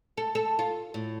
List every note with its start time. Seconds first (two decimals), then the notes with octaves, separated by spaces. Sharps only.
0.17 A4
0.35 A4
0.59 F4
0.94 A2